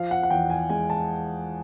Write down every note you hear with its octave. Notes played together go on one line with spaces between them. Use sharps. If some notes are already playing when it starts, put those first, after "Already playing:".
Already playing: F3 F5
F#5
F#5
E2 G5
G#5
G#3 G#5
A5